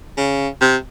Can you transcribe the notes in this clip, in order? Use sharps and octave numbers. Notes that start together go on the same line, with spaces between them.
C#3
C3